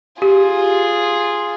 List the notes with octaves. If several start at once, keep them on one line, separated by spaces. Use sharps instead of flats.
F4 G4 G#4